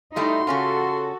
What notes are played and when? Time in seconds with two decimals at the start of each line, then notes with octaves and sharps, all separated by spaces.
0.16 G3 A3 D#4 E4 C6
0.47 C#3 C#4 F4 F#4 A4